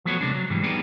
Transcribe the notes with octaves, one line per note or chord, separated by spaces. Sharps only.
F3 F#3 A3 B3 F#4 C#5
C3 G#3 D4
F#3
G#2 E3 G3
G3 A#3 B3 D4 D#4 G#4